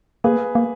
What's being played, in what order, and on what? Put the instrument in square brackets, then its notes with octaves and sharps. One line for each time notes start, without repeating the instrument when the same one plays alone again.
[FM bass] A#3 [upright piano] G#4 B4
[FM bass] A#3